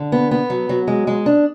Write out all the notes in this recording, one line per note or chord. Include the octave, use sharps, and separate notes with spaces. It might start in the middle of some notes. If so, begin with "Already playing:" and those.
Already playing: D3
B3
B3
F#3
F#3
G#3
G#3
D4